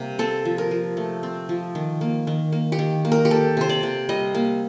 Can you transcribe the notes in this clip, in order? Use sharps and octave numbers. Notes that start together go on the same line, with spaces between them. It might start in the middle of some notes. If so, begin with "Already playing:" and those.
Already playing: C3 G3 A#3
C4 A4
F3
A#4
F3
A3
C4
F3
D#3
A#3
D#3
A#3
G4
D#3
A#3
A#4
G4
A#3 A4
C3 C5
D5
C3
G3 D#5
A#3